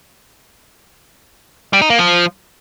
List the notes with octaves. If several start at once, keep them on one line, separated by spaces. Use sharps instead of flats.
G3
D#4
A#3
F3